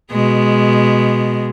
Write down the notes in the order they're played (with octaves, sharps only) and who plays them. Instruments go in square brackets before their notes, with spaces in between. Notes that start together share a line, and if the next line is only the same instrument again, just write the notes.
[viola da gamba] B2 G#3